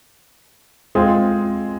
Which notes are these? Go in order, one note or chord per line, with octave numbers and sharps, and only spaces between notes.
G#3 C4 F4 G#4